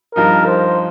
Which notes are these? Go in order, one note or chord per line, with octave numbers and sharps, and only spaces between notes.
G2 F3 D#4 A#4
C5